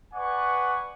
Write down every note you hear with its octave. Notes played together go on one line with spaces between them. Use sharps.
B4 D5 F#5 G#5 C#6